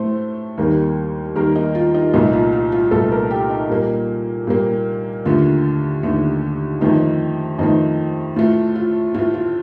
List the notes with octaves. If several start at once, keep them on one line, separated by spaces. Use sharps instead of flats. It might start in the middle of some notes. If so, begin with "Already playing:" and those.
Already playing: A2 A3 C5
D#2 D#3 G3 A#3
D#2 D#3 G3 A#3 A#4
D#4
F4
D#4
C2 A#2 A3 D#4
F4
F4
F4
C2 A#2 A3 A4
A#4
G4
D#4
A#2 G3 A#3
A#2 G3 A#3
D#2 D3 A3 F4
D#2 D3 A3
F2 D#3 A3 D#4
F2 D#3 A3 D#4
A2 A3 F4
F4
A2 A3 F4
F4